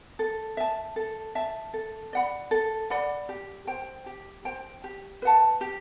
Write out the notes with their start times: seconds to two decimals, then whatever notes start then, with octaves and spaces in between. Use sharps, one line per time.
0.19 A4
0.57 E5 A5
0.96 A4
1.35 E5 A5
1.73 A4
2.13 D5 F#5 B5
2.51 A4
2.90 D5 F#5 B5
3.29 G4
3.67 C5 G5
4.06 G4
4.45 C5 G5
4.84 G4
5.22 B4 F#5 A5
5.61 G4